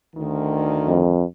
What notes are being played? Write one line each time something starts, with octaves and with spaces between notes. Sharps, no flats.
D2 D#3
F2